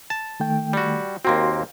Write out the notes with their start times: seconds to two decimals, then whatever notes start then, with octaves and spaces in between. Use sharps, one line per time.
0.10 A5
0.40 D#3 A3 G5
0.73 G3 F#4
1.25 D#2 A#3 C4 F#4 C6